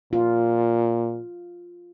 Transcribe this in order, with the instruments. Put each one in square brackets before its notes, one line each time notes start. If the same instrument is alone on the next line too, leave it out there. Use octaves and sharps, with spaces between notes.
[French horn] A#2 [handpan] F4